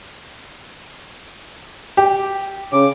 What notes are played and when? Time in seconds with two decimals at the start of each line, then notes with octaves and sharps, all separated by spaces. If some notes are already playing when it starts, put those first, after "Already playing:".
1.97 G4
2.72 C#3 D6